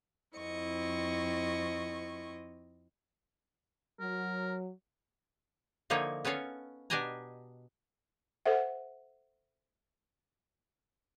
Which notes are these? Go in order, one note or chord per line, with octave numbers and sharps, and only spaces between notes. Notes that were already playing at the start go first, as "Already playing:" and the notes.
F2 C4 E4 D#5 C#6
F#3 A#4
D3 F3 A#3 D#4 E4 C#5
B3 C#4 A4 C#5 F5
B2 D4 G4 D#5 G#5 A#5
A4 C5 E5 F#5